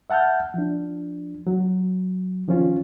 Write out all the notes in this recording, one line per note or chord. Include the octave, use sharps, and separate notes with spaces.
E5 F#5 A5 F6 G6
F3 D4
F#3
D#3 F3 C#4 F4